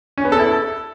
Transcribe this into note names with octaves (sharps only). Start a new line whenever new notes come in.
C#4
B3
A4
E4
A4